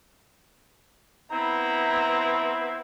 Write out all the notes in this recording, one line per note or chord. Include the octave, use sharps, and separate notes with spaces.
B3 C4 E4 A#5